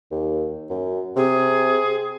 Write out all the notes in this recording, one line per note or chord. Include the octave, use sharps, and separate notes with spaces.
D#2
F#2
C3 G#4